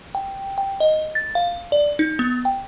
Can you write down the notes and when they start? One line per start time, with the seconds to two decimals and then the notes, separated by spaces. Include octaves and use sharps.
0.15 G5
0.58 G5
0.80 D#5
1.15 A6
1.35 F5
1.72 D5
1.99 D#4
2.19 B3
2.45 G5